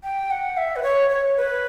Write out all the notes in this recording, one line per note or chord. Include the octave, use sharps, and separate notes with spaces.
G5
F#5
E5
B4
C#5
C#5
B4